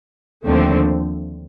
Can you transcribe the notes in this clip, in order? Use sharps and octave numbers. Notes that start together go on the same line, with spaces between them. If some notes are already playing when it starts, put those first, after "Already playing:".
D#2 D3 F3 A3 C4